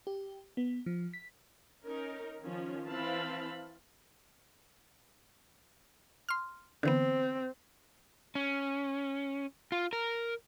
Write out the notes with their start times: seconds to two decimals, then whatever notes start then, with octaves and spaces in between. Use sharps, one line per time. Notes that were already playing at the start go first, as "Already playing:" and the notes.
0.07 G4
0.57 B3
0.86 F3
1.14 B6
1.84 C#4 D#4 A#4
2.42 D#3 F3 C#4 F4
2.87 E3 C4 F5 A5 B5
6.29 C6 F6
6.83 D3 E3 B3 C4
8.35 C#4
9.72 F4
9.93 A#4